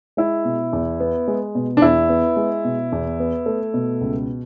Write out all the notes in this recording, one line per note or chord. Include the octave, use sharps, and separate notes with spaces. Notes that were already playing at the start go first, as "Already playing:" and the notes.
G#3 E4
B2
E2
B3
G#3
B2
D4
E2 E4
B3
G#3
B2
E2
B3
A3
B2
C#2